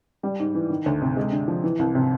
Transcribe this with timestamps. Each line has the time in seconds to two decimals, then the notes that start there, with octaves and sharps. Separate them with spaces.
0.23 G3
0.39 G#2
0.55 E3
0.70 D#3
0.86 D2
1.01 C3
1.16 G#3
1.32 D3
1.48 F3
1.64 E3
1.79 C2
1.95 C3